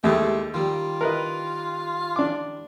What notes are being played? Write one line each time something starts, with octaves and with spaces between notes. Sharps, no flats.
D#2 G#3 A3 E4 G4
D#3 G3 F4
A#4 B4 D#5
D4 D6